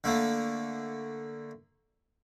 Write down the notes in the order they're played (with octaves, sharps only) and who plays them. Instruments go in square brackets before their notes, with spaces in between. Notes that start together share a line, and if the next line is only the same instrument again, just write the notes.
[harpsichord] D3 A3 A#3